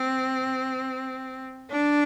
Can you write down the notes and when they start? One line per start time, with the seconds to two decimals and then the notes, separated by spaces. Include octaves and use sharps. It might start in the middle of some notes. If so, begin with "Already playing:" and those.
Already playing: C4
1.70 D4